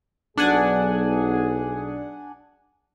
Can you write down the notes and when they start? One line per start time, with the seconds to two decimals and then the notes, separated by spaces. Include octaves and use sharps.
0.38 B1 D4 G#4 F#5 G#5